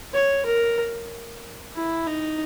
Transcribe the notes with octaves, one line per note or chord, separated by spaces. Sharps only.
C#5
A#4
E4
D#4